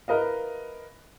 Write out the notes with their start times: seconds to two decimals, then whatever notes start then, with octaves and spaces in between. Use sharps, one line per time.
0.08 E4 A#4 B4 D#5 F5